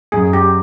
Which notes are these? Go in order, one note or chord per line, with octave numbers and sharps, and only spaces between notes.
F#2 G#4
G4